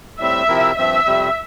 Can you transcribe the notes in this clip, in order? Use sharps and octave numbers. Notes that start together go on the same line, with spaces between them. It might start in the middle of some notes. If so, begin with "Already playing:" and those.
A2 G3 C4 E5
C3 F3 C4 E4 A#4
G2 F3 C4 E5
F2 C3 G3 C4